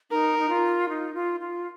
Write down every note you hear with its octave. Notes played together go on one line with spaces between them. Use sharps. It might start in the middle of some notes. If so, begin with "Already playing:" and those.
D#4 A#4
D#4
F4
D#4
F4
F4